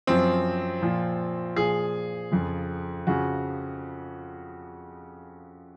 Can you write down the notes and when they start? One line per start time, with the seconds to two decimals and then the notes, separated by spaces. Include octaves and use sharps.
0.07 F#2 F3 C4
0.82 A#2 F3
1.56 A#2 F3 G#4
2.32 F2 C#3 F3
3.07 F2 C#3 F3 F#4